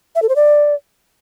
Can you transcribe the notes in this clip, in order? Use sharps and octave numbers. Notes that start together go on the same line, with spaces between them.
E5
A4
C5
D5